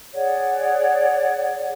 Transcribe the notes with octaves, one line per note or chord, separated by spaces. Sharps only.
G#4 C#5 D5 F#5